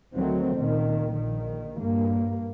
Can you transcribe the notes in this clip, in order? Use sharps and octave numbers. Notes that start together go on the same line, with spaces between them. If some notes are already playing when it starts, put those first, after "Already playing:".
D2 D#3 F#3 A3 C4
C#2 A#2 D#3
A#1 D#3
G2 A#3